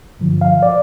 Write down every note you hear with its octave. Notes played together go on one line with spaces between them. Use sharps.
G2 D3 F3
F5
D5